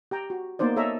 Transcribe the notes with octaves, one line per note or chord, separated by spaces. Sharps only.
G4 G5 A#5
F#4
A#3 B3 D#4 C5 D5
A4 C#5 D#5 E5 A#5